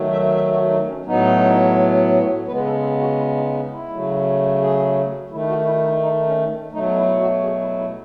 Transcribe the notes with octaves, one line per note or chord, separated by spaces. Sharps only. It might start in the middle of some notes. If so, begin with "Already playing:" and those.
Already playing: D#3 F#3 A3
E5
E5
F#4
D#4
C#4
A2 F#3 B3 D#4
C#3 G#3 B3 B4
A4
G#4
F#4
E4
D#4
D#4
E4
C#3 F#3 A3
G#4
D#3 A3 E4
F#4
E4
D#4
D#4
C#4
B2 F#3 A3 D#4
E4
F#4
G#4
E4
E4